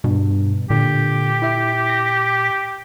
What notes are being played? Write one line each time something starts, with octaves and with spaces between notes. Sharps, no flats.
G2 B2
A#2 D3 G4
E4 E5
A#6